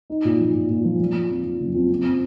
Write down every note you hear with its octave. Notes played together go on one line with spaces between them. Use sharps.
D#4
A#2
F3
A#2
A#2
F3
F3
F3
F2
F2
F#1
F2
C4
C4